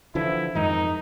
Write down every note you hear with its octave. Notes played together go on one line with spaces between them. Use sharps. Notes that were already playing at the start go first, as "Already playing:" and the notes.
D3 E3 F3 E4
F2 G#2 D#3 D#4